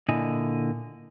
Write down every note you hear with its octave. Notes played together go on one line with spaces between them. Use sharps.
A#2 D3 E4 D#5 G#5